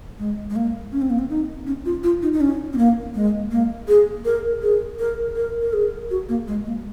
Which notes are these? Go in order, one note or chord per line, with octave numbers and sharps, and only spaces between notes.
G#3
G#3
A#3
C#4
C4
A#3
C4
D#4
C#4
F4
F4
D#4
D#4
C#4
C4
A#3
G#3
A#3
G#4
A#4
G#4
A#4
A#4
A#4
G#4
F#4
A#3
G#3
A#3